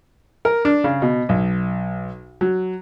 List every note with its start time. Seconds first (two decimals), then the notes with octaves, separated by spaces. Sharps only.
0.45 A#4
0.65 D4
0.84 C#3
1.02 B2
1.29 B1
2.41 F#3